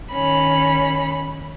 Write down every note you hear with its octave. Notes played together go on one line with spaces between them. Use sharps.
D#3 C#4 B5